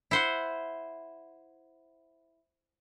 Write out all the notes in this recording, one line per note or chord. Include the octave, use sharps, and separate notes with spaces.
E4 C5 F#5